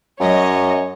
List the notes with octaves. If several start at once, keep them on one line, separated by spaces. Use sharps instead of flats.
F#2 F#3 C#5 D#5